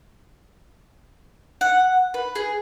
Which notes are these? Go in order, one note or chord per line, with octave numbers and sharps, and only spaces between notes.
F#5
B4
G#4